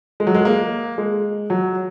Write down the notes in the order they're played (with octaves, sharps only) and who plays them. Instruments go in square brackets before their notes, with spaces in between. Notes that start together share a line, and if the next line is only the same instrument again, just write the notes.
[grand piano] G#3
F#3
G#3
A#3
G#3
F#3